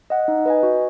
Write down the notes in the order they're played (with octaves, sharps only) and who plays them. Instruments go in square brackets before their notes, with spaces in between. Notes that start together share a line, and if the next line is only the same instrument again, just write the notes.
[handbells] D#5 F#5
D#4
B4 D#5 G#5
F#4